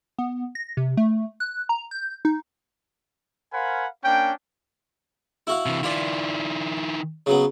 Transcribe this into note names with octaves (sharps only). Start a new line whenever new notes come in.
B3
A#6
C3
A3
F#6
A#5
G6
D#4
A#4 C5 F5 F#5 G#5 B5
A#3 C#4 D4 G5
E4 F#4 F5
C3 E3
D#3 E4 F4 D5
C#3 F#3 B3